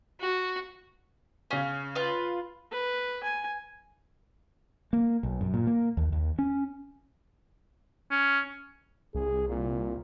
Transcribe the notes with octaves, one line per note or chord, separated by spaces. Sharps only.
F#4
C#3 C#4 F5 G#5
F4 B4
B4
G#5
A#3
B1
F#2
A#2
A#3
D#2
D#2
C#4
C#4
C2 G#4
A#2